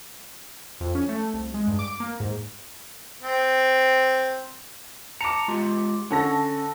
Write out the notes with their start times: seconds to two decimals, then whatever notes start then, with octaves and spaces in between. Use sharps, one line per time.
0.80 F2
0.95 C#4
1.09 A3
1.34 C2
1.54 G#3
1.68 G2
1.79 D6
2.00 A#3
2.20 G#2
3.22 C4
5.21 A5 A#5 D6 C#7
5.48 G#3 F4 G4
6.11 D3 C#4 A4 A#6